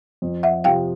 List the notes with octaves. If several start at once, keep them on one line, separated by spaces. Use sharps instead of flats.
F2
E5 F#5
C3 F3 F5 G5